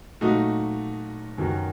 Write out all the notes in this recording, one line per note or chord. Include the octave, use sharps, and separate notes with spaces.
A#2 F#3 A3 D#4 F#4
F#2 D#3 F#3